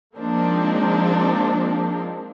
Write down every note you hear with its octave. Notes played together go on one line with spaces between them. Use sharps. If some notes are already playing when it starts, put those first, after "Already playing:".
F3 G#3 A#3 C4 D4 D#4